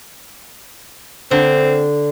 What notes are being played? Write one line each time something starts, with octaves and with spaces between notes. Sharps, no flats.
D3 C4